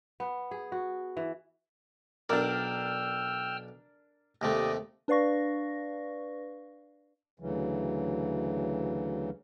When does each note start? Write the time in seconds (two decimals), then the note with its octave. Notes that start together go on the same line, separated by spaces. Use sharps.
0.20 B3
0.51 G#4
0.72 F#4
1.17 E3
2.29 B1 D4 A#4 D5 G5 E6 F6
4.41 D#2 C3 A3 D5 D#5
5.08 D4 B4 D5 F5 C#6 A#6
7.40 D2 C#3 E3 F#3